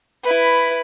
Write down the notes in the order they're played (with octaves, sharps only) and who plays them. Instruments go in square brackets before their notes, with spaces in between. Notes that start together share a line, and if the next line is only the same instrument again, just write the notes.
[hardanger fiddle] E4 B4